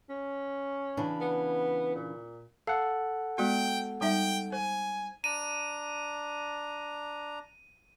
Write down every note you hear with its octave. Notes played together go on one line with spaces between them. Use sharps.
C#4
C#3 E3 D4
B3
A#2
A4 F5 F#5
G#3 B3 F#4 G5
G3 D#4 E5 G5
C5 G#5
D4 A#5 D#7